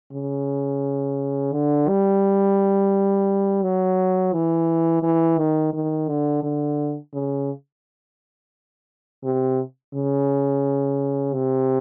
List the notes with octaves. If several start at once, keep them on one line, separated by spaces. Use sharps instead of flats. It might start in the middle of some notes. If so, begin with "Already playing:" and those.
C#3
D3
G3
F#3
E3
E3
D#3
D#3
D3
D3
C#3
C3
C#3
C3